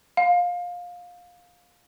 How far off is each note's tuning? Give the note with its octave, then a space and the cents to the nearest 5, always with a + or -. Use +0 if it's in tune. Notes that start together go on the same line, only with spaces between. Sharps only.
F5 +20